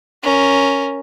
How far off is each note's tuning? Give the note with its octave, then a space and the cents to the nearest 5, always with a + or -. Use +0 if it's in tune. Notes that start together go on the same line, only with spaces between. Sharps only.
C#4 +0 A#4 +0